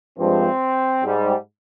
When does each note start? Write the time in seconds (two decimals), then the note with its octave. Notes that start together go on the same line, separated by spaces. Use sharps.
0.18 G2 F3 G#3 C4
1.03 G#2 G3